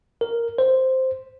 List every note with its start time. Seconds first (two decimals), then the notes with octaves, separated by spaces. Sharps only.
0.21 A#4
0.58 C5